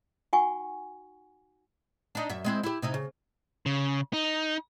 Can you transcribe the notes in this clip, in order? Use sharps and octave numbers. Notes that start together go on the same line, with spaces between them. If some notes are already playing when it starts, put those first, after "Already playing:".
D#4 F#4 F#5 G#5 C#6
D4 D#4
F#2 E5
G#3 C4 E4
E4 G4
C3 D#4 E4
C#3
C#3
D#4